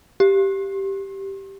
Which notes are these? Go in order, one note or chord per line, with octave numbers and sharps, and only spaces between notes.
G4